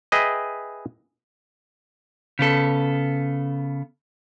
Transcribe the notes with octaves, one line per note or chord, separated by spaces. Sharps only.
G#4 B4 D#5 E5 G5
C#3 B3 A4